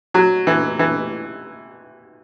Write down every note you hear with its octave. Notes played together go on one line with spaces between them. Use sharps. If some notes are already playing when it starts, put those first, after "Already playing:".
F#3
E3
E3